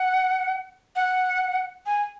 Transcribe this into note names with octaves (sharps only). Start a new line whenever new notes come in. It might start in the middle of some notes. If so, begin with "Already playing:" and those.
Already playing: F#5
F#5
G#5